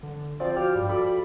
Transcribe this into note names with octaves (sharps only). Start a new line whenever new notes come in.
D3
F3 C4 D5
F#4 G4 F6
G2 G3
F#4 A4 D5 B5